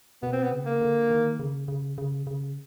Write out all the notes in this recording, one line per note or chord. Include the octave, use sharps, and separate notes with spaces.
B2 B3
C4
B3
C#3
A#3
D3
D#3
C#3
C#3
C#3
C#3